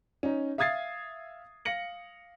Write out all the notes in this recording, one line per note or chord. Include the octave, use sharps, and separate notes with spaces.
C#4 D#4
E5 F5 D#6 G#6 A6 C7
F5 A#6 C#7 F#7